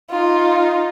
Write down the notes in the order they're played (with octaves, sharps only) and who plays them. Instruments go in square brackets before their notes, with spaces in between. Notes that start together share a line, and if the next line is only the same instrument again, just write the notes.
[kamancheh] D#4 F4